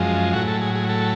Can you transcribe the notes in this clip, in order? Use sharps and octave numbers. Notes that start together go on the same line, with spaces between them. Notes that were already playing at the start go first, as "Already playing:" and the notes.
Already playing: F#2 F3 G#3
A2 F#3 F#4
A4
G#4
G#4
A4